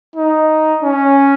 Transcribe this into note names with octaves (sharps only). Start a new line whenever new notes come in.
D#4
C#4